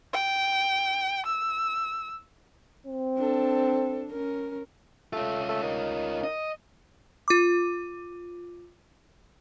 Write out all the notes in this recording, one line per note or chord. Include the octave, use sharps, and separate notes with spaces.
G5
E6
C4
D4 A4
C#4 A#4
A3 C#4 F4
A3
D#3
D#5
F4 D6